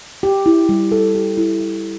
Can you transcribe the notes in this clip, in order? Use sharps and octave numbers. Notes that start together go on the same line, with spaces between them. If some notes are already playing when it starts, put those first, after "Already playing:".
G4
E4
G3
A4
G4
E4
E4